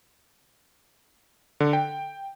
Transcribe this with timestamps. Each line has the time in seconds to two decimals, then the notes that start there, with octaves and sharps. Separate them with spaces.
1.60 D3
1.73 G5